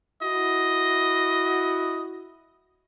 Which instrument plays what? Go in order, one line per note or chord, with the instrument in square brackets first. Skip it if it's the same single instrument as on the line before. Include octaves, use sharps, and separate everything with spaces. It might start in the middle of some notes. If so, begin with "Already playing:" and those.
[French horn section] E4 F#4 [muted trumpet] D#5